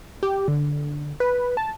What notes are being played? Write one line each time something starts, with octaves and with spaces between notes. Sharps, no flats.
G4
D3
B4
A5